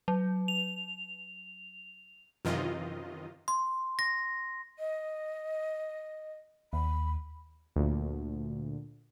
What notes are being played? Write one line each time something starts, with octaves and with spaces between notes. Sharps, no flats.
F#3
F7
F#2 C3 D#3 E3 F4 D#5
C6
A#6
D#5
D#2 B5
D2 A#2